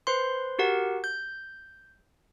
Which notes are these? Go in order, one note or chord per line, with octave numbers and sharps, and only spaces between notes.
B4 C5 C6
F#4 G4 A#4 F#5
G6